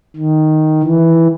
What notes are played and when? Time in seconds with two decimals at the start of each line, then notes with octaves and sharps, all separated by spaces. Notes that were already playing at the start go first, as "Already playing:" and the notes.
0.16 D#3
0.83 E3